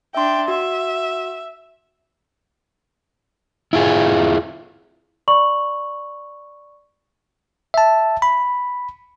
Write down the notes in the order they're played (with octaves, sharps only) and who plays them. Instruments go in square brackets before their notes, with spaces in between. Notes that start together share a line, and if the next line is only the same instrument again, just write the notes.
[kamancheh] D4 G5 [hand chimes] E5 C6
[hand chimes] F#4 [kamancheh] E5
[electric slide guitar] E4 F4 G#4
[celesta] D5 B5 C#6 F#7
[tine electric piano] E5 A5
B5